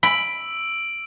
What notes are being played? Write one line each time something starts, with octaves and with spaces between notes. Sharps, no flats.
B5 E6 D7 F#7